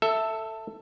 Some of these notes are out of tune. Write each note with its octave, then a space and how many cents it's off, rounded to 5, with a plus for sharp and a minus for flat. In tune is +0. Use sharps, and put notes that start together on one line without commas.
A4 +15 E5 +0